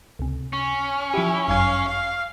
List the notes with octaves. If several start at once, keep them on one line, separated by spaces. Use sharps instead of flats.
C#2 C3
C#4
F3 E4 G4
G1 F#2 F5 G#5
F5